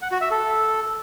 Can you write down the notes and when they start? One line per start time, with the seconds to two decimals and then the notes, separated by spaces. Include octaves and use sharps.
0.02 F#5
0.11 F#4
0.21 E5
0.31 A4